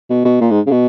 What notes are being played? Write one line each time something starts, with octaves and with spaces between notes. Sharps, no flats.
B2
B2
A#2
G#2
C#3
B2